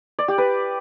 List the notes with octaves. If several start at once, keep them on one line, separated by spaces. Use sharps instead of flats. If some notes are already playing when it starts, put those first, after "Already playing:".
D5
G4
B4